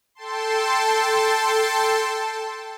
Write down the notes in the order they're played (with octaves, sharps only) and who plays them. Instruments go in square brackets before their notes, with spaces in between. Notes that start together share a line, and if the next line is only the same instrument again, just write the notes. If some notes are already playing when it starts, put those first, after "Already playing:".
[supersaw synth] A4 G5 A5 C6